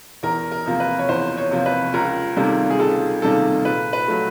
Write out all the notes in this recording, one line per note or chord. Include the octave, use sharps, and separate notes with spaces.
E2 A#4
A#4
C3 F3 A#3
B4
C#5
E2 C5
C#5
C3 F3 A#3
B4
C#2 A#4
C3 D#3 G3 A#3 A4
G#4
C#2 A4
C3 D#3 G3 A#3 A4
A#2 B4
B4
F#3 A3